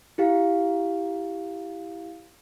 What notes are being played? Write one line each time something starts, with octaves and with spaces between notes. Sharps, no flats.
E4 G4 F5